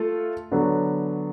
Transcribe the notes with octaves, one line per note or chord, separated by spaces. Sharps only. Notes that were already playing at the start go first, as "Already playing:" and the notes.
Already playing: A3 F4 A4
D3 F#3 B3